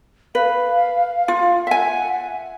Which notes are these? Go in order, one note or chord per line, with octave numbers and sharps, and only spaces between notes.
B4 F5
F4
E5 F#5 G#5